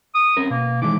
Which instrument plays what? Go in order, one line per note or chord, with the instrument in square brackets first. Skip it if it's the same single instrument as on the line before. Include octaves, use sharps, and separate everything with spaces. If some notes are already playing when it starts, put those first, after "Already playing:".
[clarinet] D#6
[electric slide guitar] C4 C#4 A#4
[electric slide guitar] B2 [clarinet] A#3
[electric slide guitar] D#3 E3 G#3 [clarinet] D6